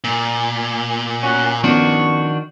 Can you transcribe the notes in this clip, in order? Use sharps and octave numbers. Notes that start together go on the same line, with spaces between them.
A#2
C#4 F#4
D#3 F3 B3 C#4 D4 F#4 C#6